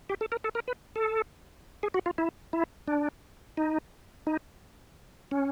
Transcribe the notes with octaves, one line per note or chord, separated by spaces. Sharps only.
G4
A4
A#4
A4
A#4
B4
A4
G#4
F#4
F4
E4
E4
D4
D#4
D#4
C#4